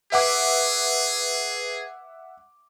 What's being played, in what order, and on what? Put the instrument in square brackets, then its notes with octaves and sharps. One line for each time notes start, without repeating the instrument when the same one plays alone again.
[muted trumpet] G#4 [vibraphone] B4 [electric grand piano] E5 F#5 D6